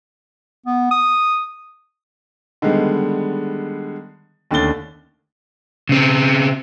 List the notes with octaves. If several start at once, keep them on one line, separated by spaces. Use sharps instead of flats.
B3
D#6
D3 D#3 G3 G#3 B3
D#2 D3 A3 C#4 A6 G7
C#3 C4